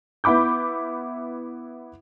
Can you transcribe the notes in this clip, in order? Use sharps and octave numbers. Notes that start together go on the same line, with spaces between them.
B3 E4 B5 D6 G6